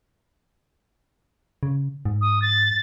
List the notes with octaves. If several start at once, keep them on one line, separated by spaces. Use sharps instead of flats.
C#3
G#2
D#6
A6